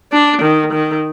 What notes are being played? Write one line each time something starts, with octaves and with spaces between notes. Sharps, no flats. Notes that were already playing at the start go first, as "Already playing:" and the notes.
D4
D#3
D#3